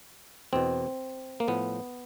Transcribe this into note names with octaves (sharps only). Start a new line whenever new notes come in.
E2 B2 C4
A#3
A2 F3 B3